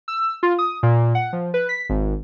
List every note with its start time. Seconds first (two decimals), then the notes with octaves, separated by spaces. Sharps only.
0.08 E6
0.43 F4
0.59 D#6
0.83 A#2
1.15 F#5
1.33 F3
1.54 B4
1.69 B6
1.90 G#1